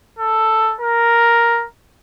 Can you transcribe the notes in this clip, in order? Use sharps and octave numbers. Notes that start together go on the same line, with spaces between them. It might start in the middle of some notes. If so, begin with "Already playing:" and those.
A4
A#4